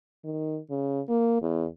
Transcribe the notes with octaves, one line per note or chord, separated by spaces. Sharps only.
D#3
C#3
A#3
E2